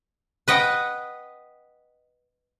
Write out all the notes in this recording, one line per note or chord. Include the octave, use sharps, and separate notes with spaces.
B4 D#5 F#5 G5